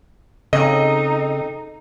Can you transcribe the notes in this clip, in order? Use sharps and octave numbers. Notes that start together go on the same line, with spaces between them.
C#3 C4 D#4 A4 D#5